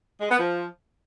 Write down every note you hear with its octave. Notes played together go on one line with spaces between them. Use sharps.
G#3
B3
F3